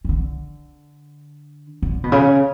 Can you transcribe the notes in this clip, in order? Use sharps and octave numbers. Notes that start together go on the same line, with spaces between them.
E3
D3
D3
B2
C#3